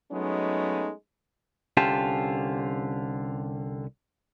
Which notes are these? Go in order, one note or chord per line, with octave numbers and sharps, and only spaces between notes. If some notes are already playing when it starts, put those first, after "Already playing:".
F#3 G#3 A3 B3 C#4 D#4
C2 D3 C#4 F4 G4 A5